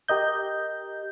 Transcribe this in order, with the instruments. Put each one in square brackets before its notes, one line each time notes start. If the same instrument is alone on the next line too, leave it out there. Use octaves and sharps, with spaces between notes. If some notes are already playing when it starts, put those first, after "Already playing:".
[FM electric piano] G4 A#4 D#5 G6